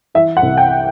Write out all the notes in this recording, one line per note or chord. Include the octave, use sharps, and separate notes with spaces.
E3 E5
F#5
C2
G5